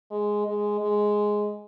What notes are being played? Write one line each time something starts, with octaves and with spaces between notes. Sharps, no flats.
G#3
G#3
G#3